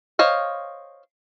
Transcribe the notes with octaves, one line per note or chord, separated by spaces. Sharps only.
C5 C#5 D#5 F5